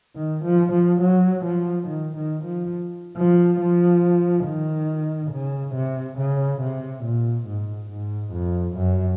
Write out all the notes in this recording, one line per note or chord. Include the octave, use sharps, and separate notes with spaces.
D#3
F3
F3
F#3
F3
D#3
D#3
F3
F3
F3
D#3
C#3
C3
C#3
C3
A#2
G#2
G#2
F2
F#2